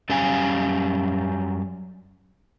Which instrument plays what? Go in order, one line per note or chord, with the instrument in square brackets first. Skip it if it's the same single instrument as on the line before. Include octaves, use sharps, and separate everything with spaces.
[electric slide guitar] F#2 G3 C#4 C#5 F5 G#5